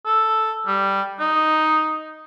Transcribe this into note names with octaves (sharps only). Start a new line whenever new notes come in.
A4
G3
D#4